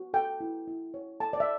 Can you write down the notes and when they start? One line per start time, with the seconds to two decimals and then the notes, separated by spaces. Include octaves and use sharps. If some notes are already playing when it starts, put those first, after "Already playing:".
Already playing: F#4
0.14 A4 G5
0.41 E4
0.68 E4
0.94 C#5
1.20 A4 A5
1.33 D5
1.40 E5